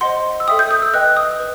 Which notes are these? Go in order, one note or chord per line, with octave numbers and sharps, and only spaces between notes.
C5 D#5 F#5 C6
E6
A4 E5 G5 D#6
G6
D#6
E6
B4 D#5 G5 F#6
D#6
B4